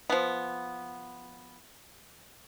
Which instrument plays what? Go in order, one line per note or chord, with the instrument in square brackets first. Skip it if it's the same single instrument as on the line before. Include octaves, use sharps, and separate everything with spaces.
[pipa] F3 B3